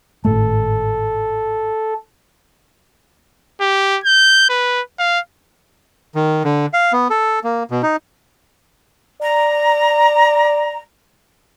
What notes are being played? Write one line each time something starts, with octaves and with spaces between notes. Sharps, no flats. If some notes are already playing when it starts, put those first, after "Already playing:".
G#1 A2 A3 A4
G4
G6
B4
F5
D#3
D3
F5
B3
A4
A#3
B2
D#4
D5 A#5